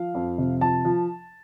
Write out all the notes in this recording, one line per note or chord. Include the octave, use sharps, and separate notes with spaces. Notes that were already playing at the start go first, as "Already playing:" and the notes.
Already playing: F3 F5
F2
C3
F3 A5
F3